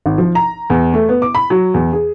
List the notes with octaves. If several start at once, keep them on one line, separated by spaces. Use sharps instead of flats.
G#1
F3
A#5
E2
A3
B3
D6
B5
F#3
E2
G#4